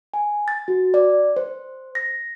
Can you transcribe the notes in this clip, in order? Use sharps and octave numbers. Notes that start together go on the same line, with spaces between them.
G#5
A6
F#4
D5
C5
A#6